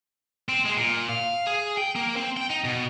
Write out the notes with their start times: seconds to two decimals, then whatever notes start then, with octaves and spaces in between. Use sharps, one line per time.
0.49 C4
0.65 G#3
0.77 A#2
1.09 F5
1.47 G#4
1.77 G5
1.96 A#3
2.16 C4
2.37 G5
2.50 D#4
2.64 B2